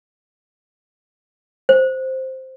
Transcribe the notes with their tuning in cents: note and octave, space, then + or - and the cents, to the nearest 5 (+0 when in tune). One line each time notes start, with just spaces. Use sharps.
C5 +0